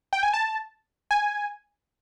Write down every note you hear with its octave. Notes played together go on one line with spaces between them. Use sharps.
G5
G#5
A5
G#5